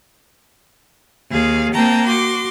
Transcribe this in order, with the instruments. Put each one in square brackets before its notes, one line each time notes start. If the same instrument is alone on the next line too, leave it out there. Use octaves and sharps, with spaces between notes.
[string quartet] D#2 G#4 F5
A#3 C4 G5 A5 A#5
F#4 C6 D6